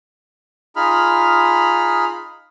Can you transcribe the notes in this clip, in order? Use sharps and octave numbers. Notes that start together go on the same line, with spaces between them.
D#4 F4 G#4 B5 F6